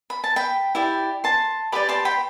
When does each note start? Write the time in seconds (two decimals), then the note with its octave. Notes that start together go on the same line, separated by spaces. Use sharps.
0.10 B5
0.24 A5
0.36 G5 B5
0.75 E4 G4 D5
1.24 A5 C6
1.72 G4 B4 D5 B5 D6
1.89 A5 C6
2.05 G5 B5